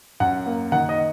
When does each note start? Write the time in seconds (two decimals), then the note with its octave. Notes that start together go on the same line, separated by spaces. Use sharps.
0.20 F#2 F#5
0.46 A#3
0.72 D#3 F#5
0.89 D#5